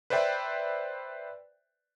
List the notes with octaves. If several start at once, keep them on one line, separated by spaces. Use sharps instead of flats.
B4 C5 D5 E5 G5